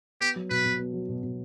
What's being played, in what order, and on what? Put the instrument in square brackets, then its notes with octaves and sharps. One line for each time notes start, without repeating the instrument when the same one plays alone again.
[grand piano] B3 [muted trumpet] G4
[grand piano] F#3
[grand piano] B2 [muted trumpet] B4
[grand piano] B2
B3
F#3
B2
B2